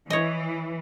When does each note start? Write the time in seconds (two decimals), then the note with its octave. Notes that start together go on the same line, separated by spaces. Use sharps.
0.10 E3 C#5 D#5